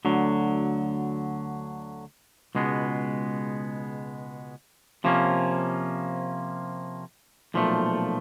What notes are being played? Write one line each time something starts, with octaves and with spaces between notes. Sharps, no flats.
D2 D3 F#3
C#2 B2 G#3 B3
C3 F3 A#3 C#4
B1 A#2 F3 A3